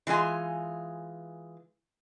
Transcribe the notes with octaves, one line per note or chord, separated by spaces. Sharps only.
E3 G#3 F4 G#5